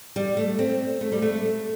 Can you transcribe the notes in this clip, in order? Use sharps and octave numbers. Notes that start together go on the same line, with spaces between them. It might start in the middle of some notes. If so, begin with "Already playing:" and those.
G3
A3
C4
A3
G3
A3